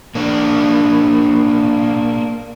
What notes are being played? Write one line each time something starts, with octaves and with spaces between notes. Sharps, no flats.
A#3 D4